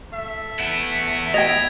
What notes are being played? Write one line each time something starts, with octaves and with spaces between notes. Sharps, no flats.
A3 E5
B3 E4
D#5 G5 G#6 F7